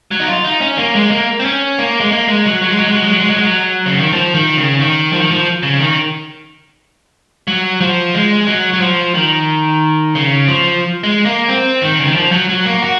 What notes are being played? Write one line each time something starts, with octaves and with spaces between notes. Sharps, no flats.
F#3
D#4
F4
D#4
C#4
A#3
G#3
A#3
C4
C#4
A#3
G#3
A#3
G#3
F#3
F#3
G#3
F#3
G#3
F#3
G#3
F#3
G#3
F#3
G#3
F#3
C#3
D#3
F3
D#3
C#3
D#3
F3
D#3
F3
C#3
D#3
F#3
F3
G#3
F#3
F#3
F3
D#3
C#3
F3
G#3
A#3
C4
D#3
C#3
D#3
F3
F#3
F#3
A#3
F#4